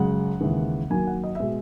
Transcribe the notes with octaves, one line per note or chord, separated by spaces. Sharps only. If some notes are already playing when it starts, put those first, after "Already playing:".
Already playing: F#2 C#3 G#3 F#5
D#2 C#3 E3 G#3
F#2 D#3 F#3 A#3 G#5
F#5
D#5
B2 G#3 E5